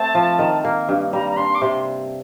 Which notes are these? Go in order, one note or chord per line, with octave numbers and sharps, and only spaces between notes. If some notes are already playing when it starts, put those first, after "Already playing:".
Already playing: A3 C4 A5
F3
D#3
A#3
G2
G3 A#5
A#5
D4 C6
D6
C3 C6